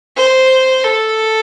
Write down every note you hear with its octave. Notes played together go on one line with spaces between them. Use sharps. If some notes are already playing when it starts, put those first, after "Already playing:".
C5
A4